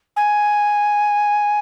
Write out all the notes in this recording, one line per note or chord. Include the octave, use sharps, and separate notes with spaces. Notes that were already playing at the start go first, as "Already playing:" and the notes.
G#5